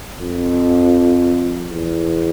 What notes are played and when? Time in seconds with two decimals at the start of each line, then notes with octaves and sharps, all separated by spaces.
0.22 F2
1.69 E2